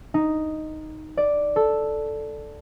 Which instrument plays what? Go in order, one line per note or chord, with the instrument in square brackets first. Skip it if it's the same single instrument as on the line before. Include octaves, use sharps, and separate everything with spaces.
[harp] D#4
D5
A4